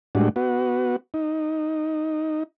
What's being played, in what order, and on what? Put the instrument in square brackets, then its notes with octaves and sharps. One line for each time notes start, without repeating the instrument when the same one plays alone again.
[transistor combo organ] A2 G3 G#3 D4 F#4
B3 F#4
D#4